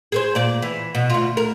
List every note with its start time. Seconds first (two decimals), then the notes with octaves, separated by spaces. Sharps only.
0.12 G#4 A4 C5
0.35 A#2 D5
0.62 E3
0.95 B2
1.10 D2 F4
1.37 A#4